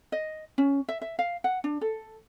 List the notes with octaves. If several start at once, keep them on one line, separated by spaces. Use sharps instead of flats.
D#5
C#4
E5
E5
F5
F#5
D4
A4